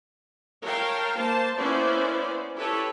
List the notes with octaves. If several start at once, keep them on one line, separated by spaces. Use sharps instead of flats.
A#4 C#5 F5 G5 A5
A#3 C5 A5
A#3 B3 C#4 E4 C5 D5
E4 G4 A4 B4 C#5